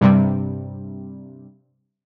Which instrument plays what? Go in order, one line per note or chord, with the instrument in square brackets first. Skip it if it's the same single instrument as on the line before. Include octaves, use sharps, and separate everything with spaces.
[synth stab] G2 C3 G3